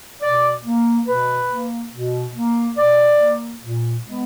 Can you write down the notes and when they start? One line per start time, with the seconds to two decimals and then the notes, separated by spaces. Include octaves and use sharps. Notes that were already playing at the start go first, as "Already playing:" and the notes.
0.22 B2 D5
0.64 A#3
1.06 B2 B4
1.49 A#3
1.92 B2
2.35 A#3
2.76 B2 D5
3.19 A#3
3.62 A#2
4.03 G#3 B3